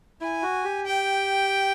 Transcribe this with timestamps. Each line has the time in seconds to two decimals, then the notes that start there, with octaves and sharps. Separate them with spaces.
0.21 E4 G#5
0.42 F#4
0.64 G4
0.86 G5